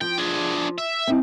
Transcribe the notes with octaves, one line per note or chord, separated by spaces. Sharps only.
F3 G5
D4 G#4
E5
C4 D#4 E4